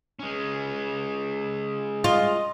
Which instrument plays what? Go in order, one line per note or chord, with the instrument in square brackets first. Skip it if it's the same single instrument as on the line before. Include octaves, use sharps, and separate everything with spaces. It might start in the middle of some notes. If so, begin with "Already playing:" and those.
[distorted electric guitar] G#3 C#4
[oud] F4 [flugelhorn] D#5